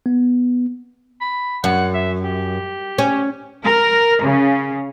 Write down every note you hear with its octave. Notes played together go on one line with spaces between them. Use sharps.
B3
B5
F#2 F#5
E5
G4
C#4
A#4
C#3